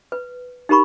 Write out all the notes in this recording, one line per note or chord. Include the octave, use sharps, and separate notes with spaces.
B4
D#4 G4 A#4 B5 C#6